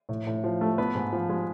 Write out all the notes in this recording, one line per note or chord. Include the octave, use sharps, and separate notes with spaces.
A2
A2
F3
A3
B3 B4
G#2
F3
G#3